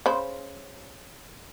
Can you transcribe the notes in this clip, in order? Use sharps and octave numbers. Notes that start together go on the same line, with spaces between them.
C#3 C5 B5